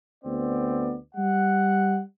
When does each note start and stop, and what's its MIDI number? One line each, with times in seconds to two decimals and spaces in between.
0.25 0.95 38
0.25 0.95 59
0.25 0.95 60
0.25 0.95 74
1.15 2.01 55
1.15 2.01 78